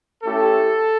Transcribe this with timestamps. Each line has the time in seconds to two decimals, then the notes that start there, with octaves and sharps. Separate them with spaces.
0.23 A3 C#4 E4 G4 A4